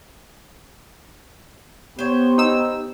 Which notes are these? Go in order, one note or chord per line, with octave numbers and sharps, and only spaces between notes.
B3 G4 C5 C#5
D#4 E6